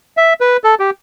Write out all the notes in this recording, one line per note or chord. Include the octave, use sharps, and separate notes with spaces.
E5
B4
A4
G4